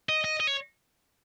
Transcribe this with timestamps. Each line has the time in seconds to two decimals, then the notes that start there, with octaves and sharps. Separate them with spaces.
0.09 D#5
0.24 D#5
0.40 D#5
0.47 C#5